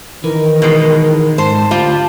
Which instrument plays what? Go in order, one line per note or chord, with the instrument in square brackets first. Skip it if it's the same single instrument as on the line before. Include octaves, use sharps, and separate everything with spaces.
[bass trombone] D#3 [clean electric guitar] E3 [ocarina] A#4
[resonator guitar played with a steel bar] B2 G#3
[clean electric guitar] G#2 [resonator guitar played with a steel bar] C5 [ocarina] A5
[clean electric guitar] D2 [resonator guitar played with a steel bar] G3 F4